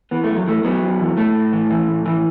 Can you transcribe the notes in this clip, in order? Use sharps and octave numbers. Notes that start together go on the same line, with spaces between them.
E3 B3
F#2 A3
F#3
E3 A3
F#2 F#3 B3
F#2
E3
A2 A3
A2
E3
E3
A2
E3